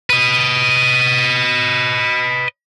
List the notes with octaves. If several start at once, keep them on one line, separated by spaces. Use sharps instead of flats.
B4 D#5